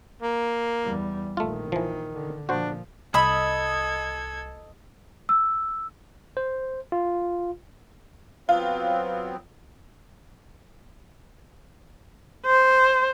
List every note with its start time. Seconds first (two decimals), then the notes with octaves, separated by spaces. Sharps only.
0.22 A#3
0.83 E2 G3
1.37 A#1 D#3 A3 F4
1.72 E3 F3
2.13 D3
2.49 A#2 F3 D4 F#4 C5
3.14 C2 A4 D#5 B5 E6 G#6
5.29 E6
6.37 C5
6.92 F4
8.49 F#3 B3 C4 F4
12.46 C5